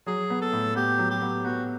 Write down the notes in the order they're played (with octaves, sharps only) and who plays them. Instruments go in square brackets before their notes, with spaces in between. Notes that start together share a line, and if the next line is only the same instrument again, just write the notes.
[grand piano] F#3 [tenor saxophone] G#4
[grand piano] B3
[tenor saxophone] A4
[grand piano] A2
[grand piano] B3 [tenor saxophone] G4
[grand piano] F#3
[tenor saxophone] G4
[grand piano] B3
[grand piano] B3 [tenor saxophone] F#4